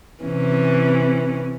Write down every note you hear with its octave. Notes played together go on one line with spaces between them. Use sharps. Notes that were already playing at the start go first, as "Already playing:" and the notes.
C3 E3 C#4